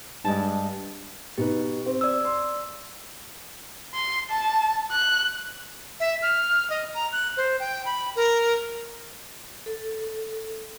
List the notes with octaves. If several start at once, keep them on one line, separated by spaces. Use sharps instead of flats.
G2 G#3 A5
B2 D#4 G4 B4
C4
D5 E6
C6
C6
A5
F#6
E5
F6
D#5
A#5
F#6
C5
G5
B5
A#4
A4